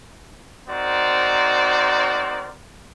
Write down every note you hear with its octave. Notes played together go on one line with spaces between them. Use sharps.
C4 D#4 F#4 A#4 C5 D5